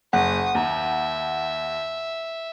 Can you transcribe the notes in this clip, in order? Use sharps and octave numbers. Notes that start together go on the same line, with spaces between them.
F#1 F#5 C#6 D#6
D#2 E5 A#5